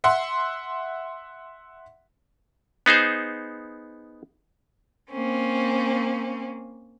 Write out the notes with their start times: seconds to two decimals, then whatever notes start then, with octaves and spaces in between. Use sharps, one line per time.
0.04 E5 F#5 C6
2.86 B3 D#4 G#4 C5
5.11 A#3 C4 C#4